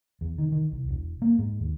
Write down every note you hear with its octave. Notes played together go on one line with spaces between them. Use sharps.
E2
D#3
D#3
C2
E1
A#3
G#2
D#2